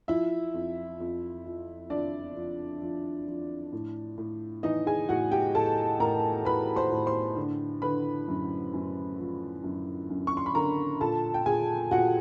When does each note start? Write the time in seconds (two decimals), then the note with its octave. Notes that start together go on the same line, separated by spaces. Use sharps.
0.08 F3 E4 E5
0.54 F2
1.00 F2
1.45 F3
1.90 F3 D4 D5
2.36 F3
2.82 F3
3.28 F3
3.73 A2
4.18 A2
4.63 E3 D#4 D#5
4.86 G#4 G#5
5.09 A2 F#4 F#5
5.32 G4 G5
5.55 A2 A4 A5
6.00 A2 A#4 A#5
6.45 A2 B4 B5
6.76 C5 C6
6.92 A2
7.06 C5 C6
7.36 D3
7.82 D3 B4 B5
8.28 F#2
8.74 F#2
9.19 F3
9.64 F#2
10.10 F#2
10.27 C#6
10.37 C6
10.46 B5
10.55 D3 A#4 A#5
11.01 A#2 A4 A5
11.34 G5
11.46 A#2 G#4 G#5
11.91 A#2 F#4 F#5